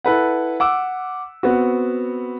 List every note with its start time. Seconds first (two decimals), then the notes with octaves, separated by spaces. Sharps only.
0.04 E4 A4 B4 F#5
0.60 F#5 D6 E6
1.43 B3 C4 F#4